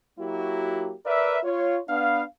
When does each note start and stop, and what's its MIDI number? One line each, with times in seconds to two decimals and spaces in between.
0.19 0.93 54
0.19 0.93 58
0.19 0.93 64
0.19 0.93 66
0.19 0.93 67
1.06 1.38 70
1.06 1.38 71
1.06 1.38 74
1.06 1.38 76
1.44 1.79 65
1.44 1.79 73
1.89 2.23 59
1.89 2.23 62
1.89 2.23 77